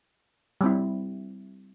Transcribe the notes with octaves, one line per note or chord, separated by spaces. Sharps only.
G3 C4 E4